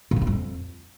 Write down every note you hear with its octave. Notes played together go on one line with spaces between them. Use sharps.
A#2
D#3
G2
F2